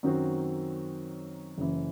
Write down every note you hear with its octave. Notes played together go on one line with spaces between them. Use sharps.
F#2 D#3 F#3 C4 F#4
F#1 F#2 E3